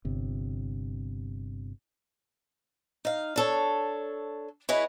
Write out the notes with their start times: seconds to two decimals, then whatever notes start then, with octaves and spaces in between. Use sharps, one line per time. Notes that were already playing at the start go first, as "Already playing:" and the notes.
0.05 G1 C3
3.05 D#4 F5
3.36 D4 A4 C#5
4.69 E4 G#4 B4 C#5 D#5